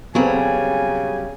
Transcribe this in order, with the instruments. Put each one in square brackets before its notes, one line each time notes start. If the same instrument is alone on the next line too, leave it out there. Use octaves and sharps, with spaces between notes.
[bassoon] C#3 [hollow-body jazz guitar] F#3 G3 [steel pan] B3 C4 A4 [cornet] G#5